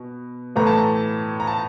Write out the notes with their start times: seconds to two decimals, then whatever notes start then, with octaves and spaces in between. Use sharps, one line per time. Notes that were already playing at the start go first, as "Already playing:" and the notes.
Already playing: B2
0.56 A2 E3 A3 A#5
0.67 A5
0.78 A#5
1.40 A#5
1.47 A5